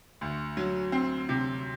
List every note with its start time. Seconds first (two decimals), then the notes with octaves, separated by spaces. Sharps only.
0.21 D2
0.57 F#3
0.92 C4
1.29 C3